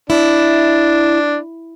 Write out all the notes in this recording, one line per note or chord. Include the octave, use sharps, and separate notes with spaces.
D4 E4